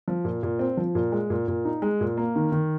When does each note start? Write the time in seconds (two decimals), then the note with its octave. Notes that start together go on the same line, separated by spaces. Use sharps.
0.08 F3
0.25 A#2
0.43 A#2
0.59 C4
0.77 F3
0.95 A#2
1.12 G#3
1.30 A#2
1.48 A#2
1.65 D#4
1.82 G#3
2.01 A#2
2.17 A#3
2.36 D#3
2.52 D#3